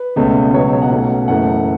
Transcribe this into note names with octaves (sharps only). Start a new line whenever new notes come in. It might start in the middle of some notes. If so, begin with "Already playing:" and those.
Already playing: B4
C#2 B2 A3 C#4
C#2 B2 F#3 B3 C#5
C#5
F#5
B1 B2 A3 C#4
F#1 F#2 E3 A3 F#5